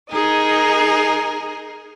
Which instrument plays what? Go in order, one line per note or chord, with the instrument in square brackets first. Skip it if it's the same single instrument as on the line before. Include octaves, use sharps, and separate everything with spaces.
[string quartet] D#4 G#4 A#4 D#5